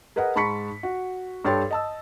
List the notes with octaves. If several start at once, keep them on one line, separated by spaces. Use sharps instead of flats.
G#4 A#4 B4 D#5 F#5
G#2 A5 B5 C#6 B6 C#7
F#4
G2 A4 C#5 G5 C6 A6
D#5 A5 E6